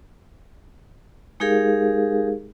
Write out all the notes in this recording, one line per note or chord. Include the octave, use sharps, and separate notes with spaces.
G#3 D#4 G4 G#4 A#4 F5